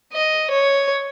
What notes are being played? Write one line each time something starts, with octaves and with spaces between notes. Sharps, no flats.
D#5
C#5